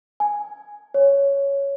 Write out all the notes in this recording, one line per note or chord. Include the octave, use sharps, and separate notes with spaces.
G#5
C#5